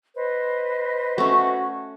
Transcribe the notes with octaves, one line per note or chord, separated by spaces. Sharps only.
B4 C5 D#5
A3 C#4 F#4